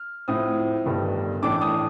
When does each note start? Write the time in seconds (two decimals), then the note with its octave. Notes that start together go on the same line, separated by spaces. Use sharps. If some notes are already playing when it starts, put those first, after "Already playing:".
Already playing: F6
0.28 A2 F3 C4 D#6
0.86 G1 G2 D#3 G3
1.42 A1 A2 A3 D4 D6
1.62 D#6